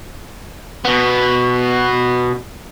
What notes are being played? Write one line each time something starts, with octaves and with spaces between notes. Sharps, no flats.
B2 B3